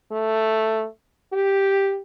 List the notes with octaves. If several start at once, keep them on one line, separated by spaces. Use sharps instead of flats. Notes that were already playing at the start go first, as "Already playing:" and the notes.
A3
G4